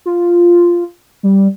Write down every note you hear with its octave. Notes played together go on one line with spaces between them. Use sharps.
F4
G3